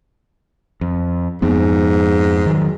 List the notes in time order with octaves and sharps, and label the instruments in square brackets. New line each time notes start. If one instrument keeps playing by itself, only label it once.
[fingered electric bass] F2
[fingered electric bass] F2 F3 B3 [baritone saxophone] G#2
[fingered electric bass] D#3 F#3